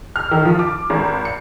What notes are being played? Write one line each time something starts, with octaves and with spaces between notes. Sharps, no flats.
F6
D#3
F3
D6
G#1
C#7